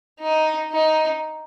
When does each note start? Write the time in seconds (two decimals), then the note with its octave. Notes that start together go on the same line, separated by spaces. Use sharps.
0.20 D#4
0.71 D#4